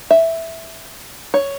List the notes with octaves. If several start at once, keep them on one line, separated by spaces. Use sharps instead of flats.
E5
C#5